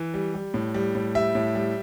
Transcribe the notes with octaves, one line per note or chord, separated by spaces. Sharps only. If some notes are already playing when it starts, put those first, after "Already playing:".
Already playing: E3
G3
G3
A2
G3
A2
G3 E5
A2
G3